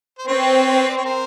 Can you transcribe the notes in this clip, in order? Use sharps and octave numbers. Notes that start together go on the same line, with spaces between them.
C5
C4 B4 C#5
D5
C#5
A#4 C5